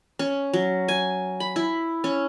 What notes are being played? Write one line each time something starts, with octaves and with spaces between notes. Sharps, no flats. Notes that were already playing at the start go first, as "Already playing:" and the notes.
C#4
F#3
G#5
B5
E4
C#4